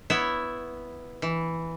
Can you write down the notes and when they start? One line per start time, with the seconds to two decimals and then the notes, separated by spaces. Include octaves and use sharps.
0.10 B3 E4 C#5 E5
1.22 E3